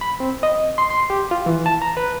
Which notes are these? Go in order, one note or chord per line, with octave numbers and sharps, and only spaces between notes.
B5
C4
D#5
C6
C6
G4
F4
E3
A5
A#5
B4